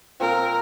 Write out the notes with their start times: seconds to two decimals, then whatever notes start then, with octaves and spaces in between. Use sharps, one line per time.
0.20 A#2 F3 C4 A#4